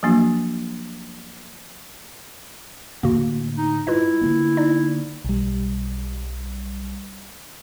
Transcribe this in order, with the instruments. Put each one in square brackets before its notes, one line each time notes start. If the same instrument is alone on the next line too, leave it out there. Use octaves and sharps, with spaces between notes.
[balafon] F3 F#3 A#3 D4 F#4
[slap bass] A2 D3 [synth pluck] A#3 F#4
[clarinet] D#4
[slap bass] G2 [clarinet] E4 [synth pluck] F4 B4 D#5
[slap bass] D3 A#3 B3
[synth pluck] D#4 D5
[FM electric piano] B1 G3